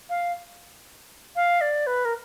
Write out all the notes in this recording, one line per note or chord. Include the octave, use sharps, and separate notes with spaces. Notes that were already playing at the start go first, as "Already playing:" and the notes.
F5
F5
D5
B4
A#4